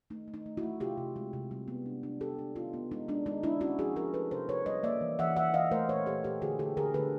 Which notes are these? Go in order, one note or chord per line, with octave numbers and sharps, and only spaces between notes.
A3 D#4
A3
D#4
A3
E4 F#4
A3
C3 F4 G4
C3
G#3
C3
G3
B3
D4
D4
D4 G4 A4
D4
B3 D#4 F4
B3
G#3 D#4
G#3 D4
G#3 D#4
G#3 D4 E4
C#4 E4 F#4
F3 F#4 G#4
F3 G#4 A#4
F3 A4 B4
C3 A#4 C5
C3 B4 C#5
G3 C#5 D#5
A#3 D5 E5
E3
E3 E5 F#5
E3 E5 F#5
E3 D#5 F5
A3 A#4 C5
A#2 B4 C#5
A#2 G4 A4
A#2 G4 A4
D3 F#4 G#4
D3 G4 A4
D3 G#4 A#4
D3 A4 B4